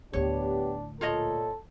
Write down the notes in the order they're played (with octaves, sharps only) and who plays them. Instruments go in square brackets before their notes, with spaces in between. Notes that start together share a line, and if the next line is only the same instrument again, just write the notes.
[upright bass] D2 A2 [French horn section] B3 G4 [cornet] D4 [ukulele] C#5
[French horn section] A#2 [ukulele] F4 C#5 D#5 [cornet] A4